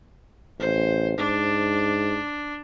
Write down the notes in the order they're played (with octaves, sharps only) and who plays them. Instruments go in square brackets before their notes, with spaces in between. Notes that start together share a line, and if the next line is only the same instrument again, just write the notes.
[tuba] A1 [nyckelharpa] C5
[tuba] G#2 [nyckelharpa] D4